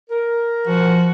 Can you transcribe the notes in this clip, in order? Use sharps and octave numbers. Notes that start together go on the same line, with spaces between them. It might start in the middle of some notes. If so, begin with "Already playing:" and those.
A#4
F3 F#4